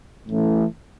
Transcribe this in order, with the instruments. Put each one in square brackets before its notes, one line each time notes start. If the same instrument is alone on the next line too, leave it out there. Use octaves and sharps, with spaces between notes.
[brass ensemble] A2 E3 A3 C#4